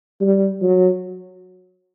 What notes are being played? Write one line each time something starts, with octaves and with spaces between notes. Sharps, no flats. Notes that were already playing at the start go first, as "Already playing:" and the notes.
G3
F#3